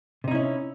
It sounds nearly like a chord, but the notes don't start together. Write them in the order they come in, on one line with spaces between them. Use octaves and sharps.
C3 D#4 E4 C#4